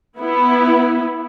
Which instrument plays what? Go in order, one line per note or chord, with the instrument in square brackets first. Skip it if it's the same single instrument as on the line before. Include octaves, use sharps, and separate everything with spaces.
[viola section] B3 E4